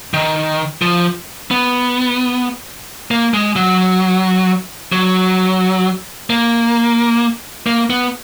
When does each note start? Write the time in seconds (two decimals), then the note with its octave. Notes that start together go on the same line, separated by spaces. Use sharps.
0.14 D#3
0.82 F3
1.51 B3
3.11 A#3
3.34 G#3
3.56 F#3
4.92 F#3
6.30 A#3
7.66 A#3
7.90 B3